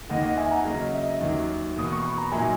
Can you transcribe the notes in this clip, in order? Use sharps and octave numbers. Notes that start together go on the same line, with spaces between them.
D#2 D#3 A#3 D#5 F#5
D#5 F#5
E5 G#5
F#5 A#5
C#3 F#3 A#3 C#4 D#5
E5
D#5
E5
D#2 D#3 F#3
E2 B2 A#3 D#6
C#6
B5
A#5
A#2 F#3 A#3 D#4 E5 G#5